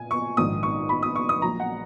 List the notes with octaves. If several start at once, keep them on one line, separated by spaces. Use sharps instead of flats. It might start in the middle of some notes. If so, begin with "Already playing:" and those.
Already playing: A#2 G#5
C#6
A#1 G#2 D#3 D#6
C#6
B5
D#6
C#6
D#6
A#1 A#2 F#3 A#5
F#5